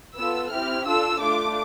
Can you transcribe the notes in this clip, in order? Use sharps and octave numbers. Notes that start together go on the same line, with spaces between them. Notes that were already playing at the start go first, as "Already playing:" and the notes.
B3 F4 A4 E6
C4 E4 G4 F6
D4 F4 A4 E6
A3 D4 F4 D6